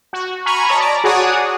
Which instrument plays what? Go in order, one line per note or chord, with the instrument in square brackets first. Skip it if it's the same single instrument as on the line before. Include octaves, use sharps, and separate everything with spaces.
[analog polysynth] F#4
G#5 A#5 B5 C#6 F6 G#6
C#5 D#5 A5 A#5
D5 A#5
F#4 G#4 C#5 D5 F#5 D#6